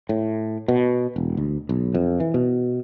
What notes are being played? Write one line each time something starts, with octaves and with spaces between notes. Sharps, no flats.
A2
B2
E1
D2
B1
F2
E3
B2